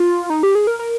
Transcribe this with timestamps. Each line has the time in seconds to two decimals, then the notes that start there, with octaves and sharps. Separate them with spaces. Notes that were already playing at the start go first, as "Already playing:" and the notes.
Already playing: F4
0.30 D#4
0.43 G4
0.55 G#4
0.67 A#4
0.79 A#4